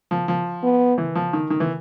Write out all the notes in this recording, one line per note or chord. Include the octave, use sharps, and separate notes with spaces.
F3
F3
B3
E3
F3
D#3
D#3
E3